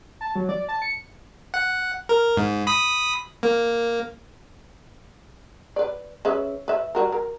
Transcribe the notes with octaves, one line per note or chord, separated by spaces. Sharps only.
A5
F#3
D5
A5
C#7
F#5
A#4
G#2
B5 D#6 B6
A#3
B4 D5
C#3 B4 E5
B4 E5
G3 F#4 A#4
A#4